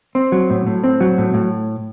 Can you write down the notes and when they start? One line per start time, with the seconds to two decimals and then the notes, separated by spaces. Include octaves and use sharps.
0.15 C4
0.32 F#3
0.50 A2
0.67 A2
0.84 C4
1.01 F#3
1.18 A2
1.34 A2